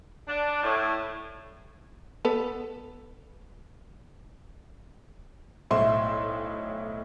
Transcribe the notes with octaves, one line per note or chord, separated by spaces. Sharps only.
D4
A2
B3 A4 B4
B1 A2 E4 C5 E5 C6